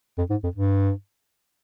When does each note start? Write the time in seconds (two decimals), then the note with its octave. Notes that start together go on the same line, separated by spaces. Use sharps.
0.18 F2
0.30 G#2
0.44 F2
0.56 G2